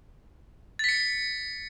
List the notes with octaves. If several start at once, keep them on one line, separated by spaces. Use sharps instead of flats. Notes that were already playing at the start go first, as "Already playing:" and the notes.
A6 B6 C#7